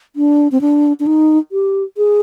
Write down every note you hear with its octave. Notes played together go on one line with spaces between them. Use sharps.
D4
C4
D4
D4
D#4
G4
G#4